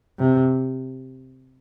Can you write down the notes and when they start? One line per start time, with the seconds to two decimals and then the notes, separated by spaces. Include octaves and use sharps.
0.19 C3